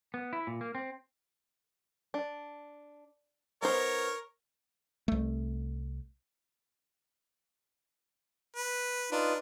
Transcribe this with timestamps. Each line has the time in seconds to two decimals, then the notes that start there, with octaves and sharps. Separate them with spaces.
0.14 B3
0.33 E4
0.47 A#2
0.61 A#3
0.75 C4
2.14 D4
3.62 B3 D#4 A#4 C5 C#5
5.08 C2 A3
8.56 B4
9.12 D4 D#4 F4 B4